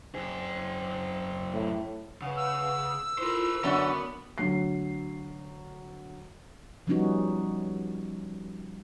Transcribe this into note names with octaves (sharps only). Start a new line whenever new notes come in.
F#2 C4 G#4
A2
C#3 B4 F5 F#5
E6
E4 F4 A4 A#4 C5
F#2 D3 B3 F#4 A#4 C#6
D2 F#3 C7
F3 G3 B3 C#4 D#4 F#4